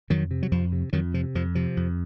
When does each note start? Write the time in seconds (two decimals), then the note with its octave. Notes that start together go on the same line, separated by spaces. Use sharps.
0.10 F2 D#3 F#3
0.31 C3
0.43 F#3
0.52 F2 F3
0.72 C3
0.93 F2 D#3 F#3
1.14 C3 F3
1.35 F2 F3
1.55 C3 F3
1.77 F2